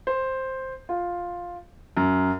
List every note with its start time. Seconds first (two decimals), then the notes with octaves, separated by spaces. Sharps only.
0.07 C5
0.89 F4
1.97 F#2